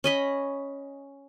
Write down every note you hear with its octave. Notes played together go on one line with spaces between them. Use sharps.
C#4 D#5 B5